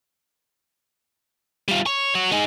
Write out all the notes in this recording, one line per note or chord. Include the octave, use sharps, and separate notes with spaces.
G3 F4
C#5
F#4 C#5
D#4 G#4